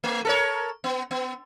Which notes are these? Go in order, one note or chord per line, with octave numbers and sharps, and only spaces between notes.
A3
A4 A#4 C#5
B3
B3